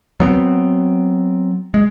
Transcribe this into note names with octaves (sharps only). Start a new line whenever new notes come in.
F#3 B3 C4
G#3